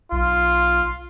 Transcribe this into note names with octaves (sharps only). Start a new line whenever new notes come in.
B1 F4